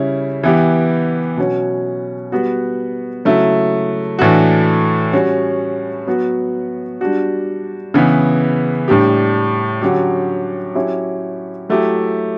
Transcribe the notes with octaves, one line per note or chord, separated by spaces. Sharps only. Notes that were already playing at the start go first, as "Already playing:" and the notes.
Already playing: C#3 G3 C#4 E4
E3 B3 E4 G4
B2 F#3 C#4
G3 B3 F#4
C#3 F#3 A3 E4
A2 E3 A3 D4 F#4
G3 C#4 F#4
F#3 B3 F#4
G3 D4 F#4
C#3 E3 B3
A2 G3 D4 G4
D3 F#3 C#4 G4
F#3 C#4 E4 G4
F#3 A3 E4 G4